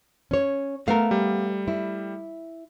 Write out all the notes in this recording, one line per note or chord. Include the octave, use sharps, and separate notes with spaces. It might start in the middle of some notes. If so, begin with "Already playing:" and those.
C#4 C#5
A3 B3 A#4 F5
G3
E4